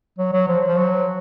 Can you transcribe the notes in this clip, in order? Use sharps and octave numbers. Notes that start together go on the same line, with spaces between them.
F#3
F#3
F3
F3
F#3